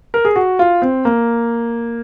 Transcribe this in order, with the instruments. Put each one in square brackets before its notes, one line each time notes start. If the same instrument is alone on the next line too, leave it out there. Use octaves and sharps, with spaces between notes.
[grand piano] A#4
G#4
F#4
F4
C4
A#3